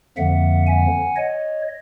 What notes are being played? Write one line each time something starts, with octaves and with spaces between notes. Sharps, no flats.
F2 D3 F3 A#3 E5 F#5
F#5 G#5
C#5 D#5